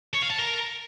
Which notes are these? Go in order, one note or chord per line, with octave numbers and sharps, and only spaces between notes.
C#5
F5
A5
A#4